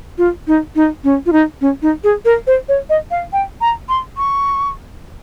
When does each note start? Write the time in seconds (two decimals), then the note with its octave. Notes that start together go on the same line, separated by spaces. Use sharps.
0.18 F4
0.47 D#4
0.76 D#4
1.04 C#4
1.26 F4
1.33 D#4
1.61 C#4
1.82 D#4
2.04 G#4
2.25 A#4
2.47 C5
2.69 C#5
2.90 D#5
3.11 F5
3.33 G5
3.61 A#5
3.89 C6
4.17 C#6